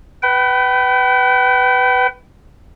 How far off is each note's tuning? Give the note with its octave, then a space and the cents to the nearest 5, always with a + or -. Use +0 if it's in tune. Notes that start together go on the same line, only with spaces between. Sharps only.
B4 +10 G5 -35